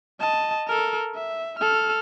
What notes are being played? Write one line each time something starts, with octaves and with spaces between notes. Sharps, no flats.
D#5 A5
A4 A#4
E5
A4 F6